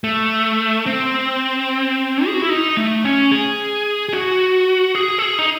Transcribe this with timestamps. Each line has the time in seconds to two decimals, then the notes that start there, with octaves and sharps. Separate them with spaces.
0.04 A3
0.86 C4
2.26 G#4
2.34 F#4
2.42 E4
2.50 D#4
2.77 A3
3.04 C#4
3.31 G#4
4.09 G#4
4.13 F#4
4.95 G#4
5.18 A4
5.22 G#4
5.39 D#4